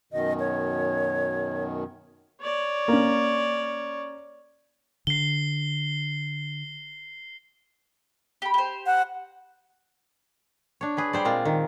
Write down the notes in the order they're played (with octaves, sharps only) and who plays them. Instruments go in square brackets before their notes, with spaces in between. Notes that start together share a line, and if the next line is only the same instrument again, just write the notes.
[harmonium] F#2 B2 D#3 [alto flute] D#5
[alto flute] C#5
[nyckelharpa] C#5 D5
[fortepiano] A#3 C#4
[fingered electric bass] D3 [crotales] C7 G7
[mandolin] G4 B5
G4 C5
[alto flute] F#5
[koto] D4 C#5
G#4 B4 G#5
G3 C5 D5
A#2 G#3 C4 F4 F5
D#3